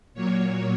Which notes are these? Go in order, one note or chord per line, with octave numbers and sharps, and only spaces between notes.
A#2 F#3 A#3 C#5